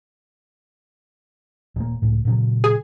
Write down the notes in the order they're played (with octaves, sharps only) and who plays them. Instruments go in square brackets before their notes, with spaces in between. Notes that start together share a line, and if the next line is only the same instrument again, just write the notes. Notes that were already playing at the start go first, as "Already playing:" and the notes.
[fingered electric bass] D#1 A#3
C#2 A2
A#2 C#3 F#3
[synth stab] G#4